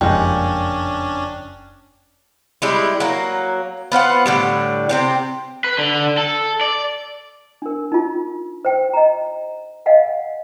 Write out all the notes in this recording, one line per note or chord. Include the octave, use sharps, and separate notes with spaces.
F#1 F2 A#2 G3 G#3 C#4 D4 G5
G3 G#3 E4
F#3 A#3
B3 F4 C5 F#5
A2 D3 G3
C3 C4 G4
B4
D3
A4
D5
D4 A#4
D#4 F4
C5 G5
D#5 A#5
D#5 F5 F#5 G#5